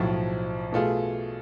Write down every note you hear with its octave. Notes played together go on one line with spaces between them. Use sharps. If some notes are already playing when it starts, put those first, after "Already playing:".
Already playing: B1 A2 F3
B2 A3 F4 G#4